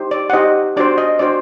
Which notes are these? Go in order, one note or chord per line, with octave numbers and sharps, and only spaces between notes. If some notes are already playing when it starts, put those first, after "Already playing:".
Already playing: D#4 G4 C5
D5
F#5
D#4 G4 C5 D#5
D4 F#4 C5 D5
D#5
D4 F#4 C5 D5